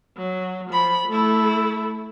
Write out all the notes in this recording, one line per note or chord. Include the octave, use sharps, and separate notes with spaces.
F#3
F3 B5
A3 E4